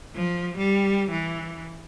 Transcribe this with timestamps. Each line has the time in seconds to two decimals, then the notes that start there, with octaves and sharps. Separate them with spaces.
0.15 F3
0.58 G3
1.11 E3